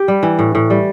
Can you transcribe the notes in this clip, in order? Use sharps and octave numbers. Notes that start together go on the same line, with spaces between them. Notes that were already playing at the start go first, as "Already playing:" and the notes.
Already playing: G4
G3
E3
A2
A2
G3